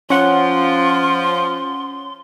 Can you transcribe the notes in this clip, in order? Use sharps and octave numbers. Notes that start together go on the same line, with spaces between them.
F3 C#4 F#5 C6